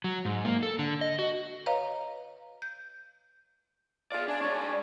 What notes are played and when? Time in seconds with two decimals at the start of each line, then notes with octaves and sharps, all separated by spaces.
0.04 F#3
0.25 G#2
0.45 A#3
0.63 A4
0.79 D3
1.01 D#5
1.19 F#4
1.66 B4 C#5 D#5 F5 A#5
2.62 G6
4.12 F4 G#4 D5 F5
4.28 D4 D5 G#5
4.41 G#3 D4 C#5
4.56 G#5